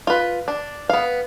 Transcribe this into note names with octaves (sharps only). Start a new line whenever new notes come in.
F4 B4
D4
B3 F5